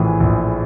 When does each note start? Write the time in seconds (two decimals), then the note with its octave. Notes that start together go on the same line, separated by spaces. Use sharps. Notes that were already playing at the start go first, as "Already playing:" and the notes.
Already playing: A#1 A2 E3 G#4
0.20 A#1